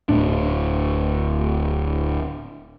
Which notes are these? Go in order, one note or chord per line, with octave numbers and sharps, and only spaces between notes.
D1 A2 D4